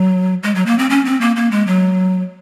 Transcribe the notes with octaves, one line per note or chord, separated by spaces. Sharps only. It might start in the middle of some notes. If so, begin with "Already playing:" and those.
Already playing: F#3
G#3
F#3
A#3
C4
C#4
C4
A#3
A#3
G#3
F#3